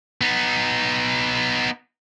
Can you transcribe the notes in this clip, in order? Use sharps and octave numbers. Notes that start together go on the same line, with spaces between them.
B3 D#4